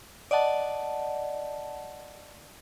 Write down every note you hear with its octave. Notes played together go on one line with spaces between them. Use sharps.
D5 D#5 F#5 A5